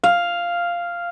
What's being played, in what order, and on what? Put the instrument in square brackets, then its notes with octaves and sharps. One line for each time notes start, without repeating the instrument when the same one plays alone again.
[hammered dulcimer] F5